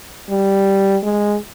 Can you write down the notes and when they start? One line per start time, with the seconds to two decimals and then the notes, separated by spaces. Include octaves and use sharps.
0.30 G3
1.03 G#3